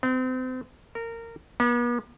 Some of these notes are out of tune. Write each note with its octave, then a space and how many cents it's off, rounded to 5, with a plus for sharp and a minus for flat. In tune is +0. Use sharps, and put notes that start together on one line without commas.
C4 -35
A#4 -20
B3 -45